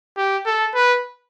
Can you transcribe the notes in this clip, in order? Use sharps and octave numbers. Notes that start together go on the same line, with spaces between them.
G4
A4
B4